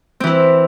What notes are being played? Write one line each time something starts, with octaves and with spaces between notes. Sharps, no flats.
E3 C4 E4